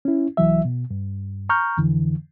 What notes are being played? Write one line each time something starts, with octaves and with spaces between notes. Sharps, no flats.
C#4 E4
C2 E3 F#3 E5
B2
G2
A#5 C#6 F6 G6
F2 D3 E3